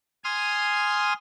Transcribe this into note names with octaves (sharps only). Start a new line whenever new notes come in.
G#5 C6 D#6 F6